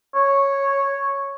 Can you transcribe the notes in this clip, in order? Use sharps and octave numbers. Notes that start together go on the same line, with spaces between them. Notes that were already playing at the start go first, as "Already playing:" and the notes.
C#5